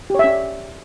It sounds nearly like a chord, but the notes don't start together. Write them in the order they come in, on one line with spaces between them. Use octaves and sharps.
G4 C#5 E5 C#4 D5